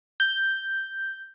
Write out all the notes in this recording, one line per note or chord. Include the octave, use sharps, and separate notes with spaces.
G6